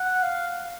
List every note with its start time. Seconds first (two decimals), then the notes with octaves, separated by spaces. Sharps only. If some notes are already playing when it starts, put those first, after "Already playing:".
Already playing: F#5
0.23 F5